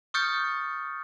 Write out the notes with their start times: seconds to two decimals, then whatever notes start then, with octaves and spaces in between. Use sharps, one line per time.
0.14 C#6 D#6 F6 G6 A6 C#7